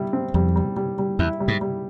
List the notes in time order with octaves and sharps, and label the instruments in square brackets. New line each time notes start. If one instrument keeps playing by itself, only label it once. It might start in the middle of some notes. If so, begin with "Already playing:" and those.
Already playing: [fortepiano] G3 E4
C4
[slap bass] F2 [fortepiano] G3
[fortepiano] G3
G3
G3
[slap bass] E2 [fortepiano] E4
[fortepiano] G3
[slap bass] G#2
[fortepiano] G3